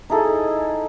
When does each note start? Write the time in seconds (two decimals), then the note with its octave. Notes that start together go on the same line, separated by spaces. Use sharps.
0.10 D#4 E4 G#4 A4